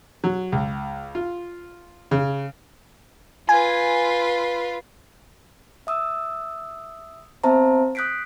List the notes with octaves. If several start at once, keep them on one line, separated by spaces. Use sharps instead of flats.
F#3
C#2
F4
C#3
F4 B4 G#5
E5 D#6 E6
B3 C4 C5 E5 A5 A#5
D#6 F#6 G6 B6 C7 D7